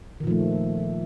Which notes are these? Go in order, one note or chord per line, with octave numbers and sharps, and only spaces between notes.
A#2 D#3 F3 A3